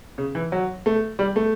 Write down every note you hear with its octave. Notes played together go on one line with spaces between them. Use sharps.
C#3
E3
F#3
A3
G3
A3